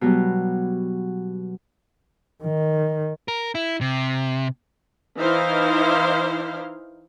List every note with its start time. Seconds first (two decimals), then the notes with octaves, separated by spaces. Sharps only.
0.01 B2 F#3 G3
2.42 D#3
3.28 A#4
3.55 E4
3.81 C3
5.18 E3 D#4 E4 C5 F5